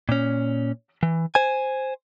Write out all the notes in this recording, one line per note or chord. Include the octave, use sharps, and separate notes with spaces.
A#2 C#4
E3
C5 G#5